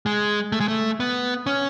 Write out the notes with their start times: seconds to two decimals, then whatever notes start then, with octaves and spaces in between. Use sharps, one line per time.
0.06 G#3
0.52 A3
0.60 G#3
0.68 A3
1.00 B3
1.46 C#4